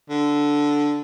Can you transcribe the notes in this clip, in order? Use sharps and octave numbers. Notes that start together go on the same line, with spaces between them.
D3